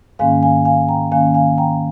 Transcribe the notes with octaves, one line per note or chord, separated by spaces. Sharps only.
G#2 D#3 A#3 C#4 F5 G#5
F5 G#5
F5 G#5
G5 A#5
G#2 D#3 A#3 C#4 F5 G#5
F5 G#5
G5 A#5